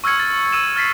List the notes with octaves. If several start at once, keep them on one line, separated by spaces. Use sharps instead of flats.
C#6 E6 F6 G#6 C#7
A6
E6 D#7 E7
F6 A6 B6 C7